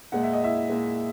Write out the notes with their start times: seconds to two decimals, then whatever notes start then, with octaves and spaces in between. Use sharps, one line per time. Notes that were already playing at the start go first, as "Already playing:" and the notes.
0.12 A#2 G#3 F#5
0.23 E5
0.33 D#5
0.44 E4 E5
0.69 A#2 G#3